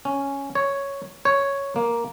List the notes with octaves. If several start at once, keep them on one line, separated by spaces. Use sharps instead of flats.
C#4
C#5
C#5
A#3